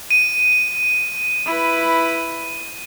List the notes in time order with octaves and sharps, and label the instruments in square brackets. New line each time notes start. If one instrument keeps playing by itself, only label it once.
[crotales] D#7
[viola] E4 B4